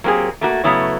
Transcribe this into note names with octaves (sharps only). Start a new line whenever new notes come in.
F#3 A#3 C4 G4 G#4
A3 A#3 F#4
C#3 F#3 A3 B3 E4 C#5